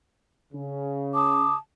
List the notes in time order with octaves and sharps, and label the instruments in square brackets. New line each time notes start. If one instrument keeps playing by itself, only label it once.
[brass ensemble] C#3
[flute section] A5 D6 D#6